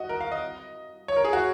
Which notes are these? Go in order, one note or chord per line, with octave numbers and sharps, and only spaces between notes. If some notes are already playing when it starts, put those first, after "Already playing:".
Already playing: F#4 D#5
A#4
F5
D#5
C#5
A#4
G#4
F#4